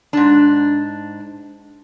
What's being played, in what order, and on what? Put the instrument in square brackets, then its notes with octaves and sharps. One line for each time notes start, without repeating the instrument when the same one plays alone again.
[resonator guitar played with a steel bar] G#2 D4